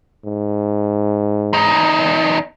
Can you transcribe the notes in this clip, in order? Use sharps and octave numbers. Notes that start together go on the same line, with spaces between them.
G#2
E2 D#4